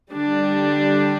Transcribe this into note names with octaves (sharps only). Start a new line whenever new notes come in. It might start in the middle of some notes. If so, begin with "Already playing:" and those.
D3 G3 D4